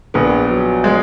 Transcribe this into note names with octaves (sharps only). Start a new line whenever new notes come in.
A#1 B3
F#3
G#3